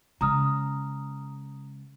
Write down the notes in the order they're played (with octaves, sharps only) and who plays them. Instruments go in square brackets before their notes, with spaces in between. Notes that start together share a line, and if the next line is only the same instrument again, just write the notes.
[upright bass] C#3 G#3 [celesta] A#5 D#6 F6